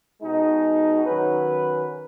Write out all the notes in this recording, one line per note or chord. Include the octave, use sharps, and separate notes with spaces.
B2 G#3 D#4
D#3 F#3 C#4 B4